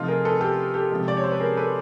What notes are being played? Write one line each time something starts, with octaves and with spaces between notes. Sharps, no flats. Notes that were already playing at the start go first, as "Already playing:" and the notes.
Already playing: C3 F3 A3 D#4 F4
G#4 A#4
A4 B4
G4 A4
G4 A4
C3 F3 G#3
D5
C#5
C5
B4
G#4 A#4
A4 B4